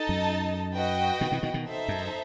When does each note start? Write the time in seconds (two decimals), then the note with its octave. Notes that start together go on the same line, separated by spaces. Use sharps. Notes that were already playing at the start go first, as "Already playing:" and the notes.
Already playing: D#4 A4 D#5 A5
0.09 F#2
0.75 F#4 B4 D#5 G5
1.21 B2 D#3
1.32 C3 E3
1.43 B2 D#3
1.54 B2 D#3
1.65 D#4 A4 C5 E5
1.88 F#2